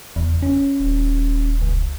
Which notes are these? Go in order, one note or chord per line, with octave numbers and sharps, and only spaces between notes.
F#1 E2
C#4
D#1
C#2